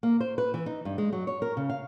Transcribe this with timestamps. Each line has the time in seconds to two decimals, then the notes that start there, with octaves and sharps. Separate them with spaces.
0.03 A#3
0.20 C5
0.38 B4
0.54 E3
0.66 D#4
0.85 G2
0.98 G#3
1.13 F#3
1.27 C#5
1.42 A#4
1.57 C#3
1.69 F5